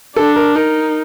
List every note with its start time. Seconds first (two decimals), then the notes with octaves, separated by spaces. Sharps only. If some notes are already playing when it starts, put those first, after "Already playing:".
0.16 D4 A4
0.36 A#4
0.55 D#4 A#4